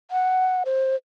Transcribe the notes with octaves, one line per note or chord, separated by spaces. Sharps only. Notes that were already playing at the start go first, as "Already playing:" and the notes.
F#5
C5